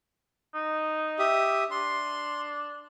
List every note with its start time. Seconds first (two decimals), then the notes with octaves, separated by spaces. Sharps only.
0.54 D#4
1.19 G4 E5 D#6
1.71 D4 C6